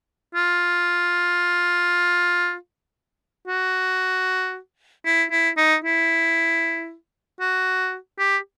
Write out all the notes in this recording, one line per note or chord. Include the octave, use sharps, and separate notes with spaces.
F4
F#4
E4
E4
D#4
E4
F#4
G4